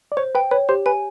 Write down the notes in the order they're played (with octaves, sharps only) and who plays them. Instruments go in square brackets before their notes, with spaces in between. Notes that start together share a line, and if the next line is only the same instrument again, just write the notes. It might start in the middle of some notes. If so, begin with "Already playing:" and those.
[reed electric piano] D5
[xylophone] C5 [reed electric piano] C#5
[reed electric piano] B4 [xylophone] G5
[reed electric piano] B4 [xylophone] C#5
[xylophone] G4 [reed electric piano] C5
[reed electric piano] B4 [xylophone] G#5